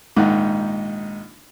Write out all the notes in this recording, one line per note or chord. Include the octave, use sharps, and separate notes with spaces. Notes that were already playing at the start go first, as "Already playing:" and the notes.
A#1 G#2 D#3 D#4 F#5